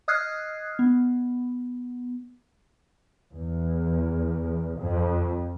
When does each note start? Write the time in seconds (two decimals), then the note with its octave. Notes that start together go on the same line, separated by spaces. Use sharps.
0.08 D#5 D#6 F6 F#6 G#6 C7
0.79 B3
3.36 E2
4.79 F2